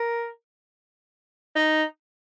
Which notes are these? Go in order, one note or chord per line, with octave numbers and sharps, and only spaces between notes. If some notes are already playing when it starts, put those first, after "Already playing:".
Already playing: A#4
D#4